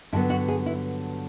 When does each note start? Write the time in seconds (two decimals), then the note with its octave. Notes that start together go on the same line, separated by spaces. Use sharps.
0.12 G2 D3 F#3 B3 E4
0.30 F#4
0.48 G#4
0.66 E4